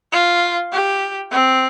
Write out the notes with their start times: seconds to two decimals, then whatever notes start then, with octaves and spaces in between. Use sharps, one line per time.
0.12 F4
0.72 G4
1.32 C4